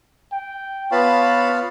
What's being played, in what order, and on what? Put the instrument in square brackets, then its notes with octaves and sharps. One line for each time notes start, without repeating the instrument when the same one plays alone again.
[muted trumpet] G5
[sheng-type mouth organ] B3 F4 F5 [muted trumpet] B4 [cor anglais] C#5 [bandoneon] A5 B5